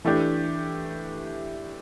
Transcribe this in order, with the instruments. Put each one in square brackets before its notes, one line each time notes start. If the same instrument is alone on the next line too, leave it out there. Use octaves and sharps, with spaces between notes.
[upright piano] E3 A3 D4 G4